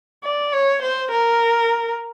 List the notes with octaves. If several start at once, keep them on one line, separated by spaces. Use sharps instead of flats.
D5
C#5
C5
A#4